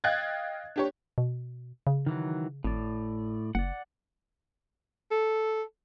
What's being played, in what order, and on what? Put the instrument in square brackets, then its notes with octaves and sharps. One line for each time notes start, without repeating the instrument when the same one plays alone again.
[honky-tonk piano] D#5 F5 G5 F#6 G#6 A6
D4 G4 C#5
[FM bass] B2
C#3
[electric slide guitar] D#3 E3 F#3
[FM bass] G#1 [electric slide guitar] A2 D5
[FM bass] F#1 [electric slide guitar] D5 F#5
[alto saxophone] A4